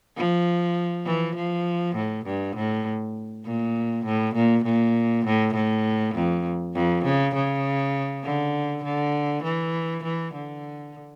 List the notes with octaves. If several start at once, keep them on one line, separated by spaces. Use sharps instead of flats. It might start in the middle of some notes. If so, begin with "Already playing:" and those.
F3
E3
F3
A2
G2
A2
A#2
A2
A#2
A#2
A2
A2
F2
F2
C#3
C#3
D3
D3
E3
E3
D3